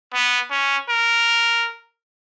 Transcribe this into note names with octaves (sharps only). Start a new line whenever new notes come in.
B3
C#4
A#4